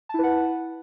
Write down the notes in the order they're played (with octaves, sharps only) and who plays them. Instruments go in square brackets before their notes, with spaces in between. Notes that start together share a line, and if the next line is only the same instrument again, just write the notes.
[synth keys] A5
E4
B4
F#5